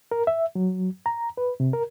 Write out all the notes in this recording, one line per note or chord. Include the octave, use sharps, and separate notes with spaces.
A#4
E5
F#3
A#5
B4
C3
A#4